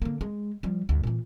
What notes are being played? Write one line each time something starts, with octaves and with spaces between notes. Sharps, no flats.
D3 A#3
G#3
F3 G3
D2 G2
A#2 E3